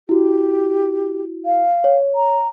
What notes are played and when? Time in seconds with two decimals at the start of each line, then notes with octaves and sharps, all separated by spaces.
0.09 E4 F#4 G4
1.45 F5
1.84 C#5
2.15 A#5